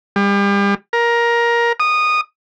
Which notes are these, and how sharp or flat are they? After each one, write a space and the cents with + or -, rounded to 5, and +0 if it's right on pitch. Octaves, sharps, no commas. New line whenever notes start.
G3 +35
A#4 +15
D#6 -15